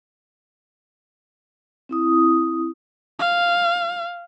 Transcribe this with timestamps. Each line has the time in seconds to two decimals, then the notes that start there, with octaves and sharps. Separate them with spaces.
1.89 C4 E4 D#6
3.19 F5